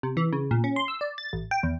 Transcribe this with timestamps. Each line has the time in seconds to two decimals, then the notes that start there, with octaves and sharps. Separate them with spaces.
0.03 C3
0.17 E3
0.33 C#3
0.51 A#2
0.64 C#4
0.76 C6
0.88 E6
1.01 D5
1.18 A6
1.33 A1
1.51 G5
1.63 E2